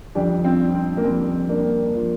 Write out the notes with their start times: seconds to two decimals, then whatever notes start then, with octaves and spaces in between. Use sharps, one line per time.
0.15 F2 D3 G3 D4 G4
0.44 C4 F4
0.74 C4
0.97 A#3
1.04 F2 D3 G3 C4
1.49 A#3 D4
1.94 F3